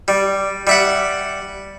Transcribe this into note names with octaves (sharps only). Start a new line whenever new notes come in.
G3
G3 E5 F#5